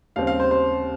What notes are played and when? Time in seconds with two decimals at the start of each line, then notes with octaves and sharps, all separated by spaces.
0.16 D#2 C#3 G3 C4 F5
0.27 F5
0.40 C5
0.51 C5